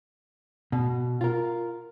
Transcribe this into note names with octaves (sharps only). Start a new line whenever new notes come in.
B2
F4 A#4